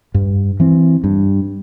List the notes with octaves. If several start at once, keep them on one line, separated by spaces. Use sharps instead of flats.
G2
E3 C4
G2